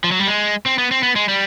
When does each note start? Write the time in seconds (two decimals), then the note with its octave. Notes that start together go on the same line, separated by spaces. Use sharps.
0.04 F3
0.11 F#3
0.20 G3
0.27 G#3
0.66 C4
0.78 B3
0.91 C4
1.03 B3
1.16 G#3
1.28 G3